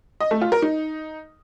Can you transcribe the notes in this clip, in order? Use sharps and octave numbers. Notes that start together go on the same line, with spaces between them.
D#5
A3
F4
A#4
D#4